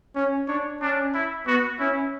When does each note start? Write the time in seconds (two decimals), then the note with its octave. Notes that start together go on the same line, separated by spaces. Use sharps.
0.16 C#4 C#5
0.48 D4 C#5
0.81 C#4 D4
1.14 E4
1.47 B3 F#4
1.79 C#4 E4